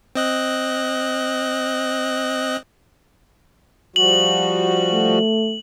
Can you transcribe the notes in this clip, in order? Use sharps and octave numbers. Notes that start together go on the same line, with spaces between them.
C4 D#5 F#6
F3 G3 F#4 F#7
A3